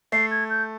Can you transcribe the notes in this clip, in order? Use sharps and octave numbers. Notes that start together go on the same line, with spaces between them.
A3 C7
G#6
G6